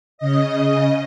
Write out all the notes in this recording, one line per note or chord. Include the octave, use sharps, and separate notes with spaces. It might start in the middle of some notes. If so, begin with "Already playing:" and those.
C#3 D#5